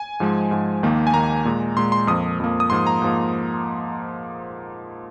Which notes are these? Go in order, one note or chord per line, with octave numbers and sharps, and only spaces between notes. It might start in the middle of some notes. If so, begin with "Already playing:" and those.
Already playing: G#5
G#2 F3 G#3
G#2 F3 G#3
D#2 D#3 A#3
G#5
D#2 D#3 A#3 A#5
A#2 G#3
A#2 G#3 C6
C6
F2 F3 A#3 D#6
F2 F3 A#3
D#6
G#2 F3 A#3 C6
A#5
G#2 F3 A#3